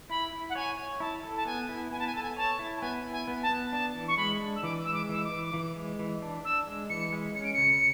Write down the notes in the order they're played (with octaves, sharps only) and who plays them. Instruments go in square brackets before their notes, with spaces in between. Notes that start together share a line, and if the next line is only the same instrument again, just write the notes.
[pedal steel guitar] E4 [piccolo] B5
[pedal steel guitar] E4
[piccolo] F#5
[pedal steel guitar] C#5 [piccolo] G#5
[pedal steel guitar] C#5
[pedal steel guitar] E4 [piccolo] A5
[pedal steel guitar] A4
[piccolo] A5
[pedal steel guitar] B3 [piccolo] G#5
[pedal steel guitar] E4
[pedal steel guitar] B3 [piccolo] G#5
[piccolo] A5
G#5
[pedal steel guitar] A4 [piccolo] A5
[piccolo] G#5
[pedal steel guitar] C#5 [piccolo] A5
[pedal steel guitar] E4
[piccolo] A5
[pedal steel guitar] B3 [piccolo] G#5
[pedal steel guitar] E4
[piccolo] G#5
[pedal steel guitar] B3
[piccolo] A5
[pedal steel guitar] B3
[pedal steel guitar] D4 [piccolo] A5
[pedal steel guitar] E3
[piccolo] C#6
[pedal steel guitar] G#3 [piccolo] B5
[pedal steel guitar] D4
[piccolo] E6
[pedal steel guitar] E3 [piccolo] D6
[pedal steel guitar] G#3 [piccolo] E6
[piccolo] D6
[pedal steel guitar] E3 [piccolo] E6
[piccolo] D6
[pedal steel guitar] E3
E3
G#3
E3
D4
[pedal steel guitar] D4 [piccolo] E6
[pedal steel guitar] G#3
[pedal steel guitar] E3 [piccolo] C#7
[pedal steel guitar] G#3
[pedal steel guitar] C#4 [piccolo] C#7
[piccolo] D7
[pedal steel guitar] C#3 [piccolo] C#7